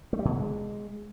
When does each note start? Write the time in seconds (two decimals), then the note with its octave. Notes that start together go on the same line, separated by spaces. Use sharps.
0.13 A3
0.19 G3
0.25 B2
0.31 D3
0.37 G#3